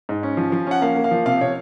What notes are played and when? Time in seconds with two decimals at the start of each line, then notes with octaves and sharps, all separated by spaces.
0.09 G#2
0.23 C#4
0.37 F3
0.52 F3
0.67 C#4 F#5
0.81 A#3 F5
0.96 A#3
1.04 F5
1.11 F3
1.26 C3 F5
1.41 C3 C#5